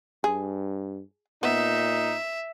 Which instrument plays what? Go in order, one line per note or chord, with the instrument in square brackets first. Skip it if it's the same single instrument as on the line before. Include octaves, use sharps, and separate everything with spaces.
[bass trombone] G2 [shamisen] G#4
[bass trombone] A#2 [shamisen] B3 [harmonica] D#4 [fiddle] E5